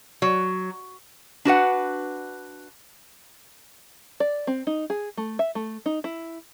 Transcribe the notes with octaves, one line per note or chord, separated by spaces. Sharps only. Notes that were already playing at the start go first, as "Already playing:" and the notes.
F#3
D4 F#4 B4 F#5
D5
C4
D#4
G#4
A3
E5
A3
D#4
E4